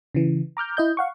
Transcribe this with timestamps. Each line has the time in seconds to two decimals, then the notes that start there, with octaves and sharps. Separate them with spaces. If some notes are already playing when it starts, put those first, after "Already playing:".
0.15 C#3 E3
0.57 A#5 D6 F6 G6
0.77 E4 D#5 G6
0.97 F5 F#5 C#6